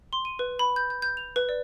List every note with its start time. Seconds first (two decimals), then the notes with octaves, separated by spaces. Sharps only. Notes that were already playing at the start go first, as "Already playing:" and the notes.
0.13 C6
0.25 D#7
0.39 B4
0.59 B5
0.76 G6
0.90 G6
1.02 G6
1.17 F7
1.36 B4
1.49 D5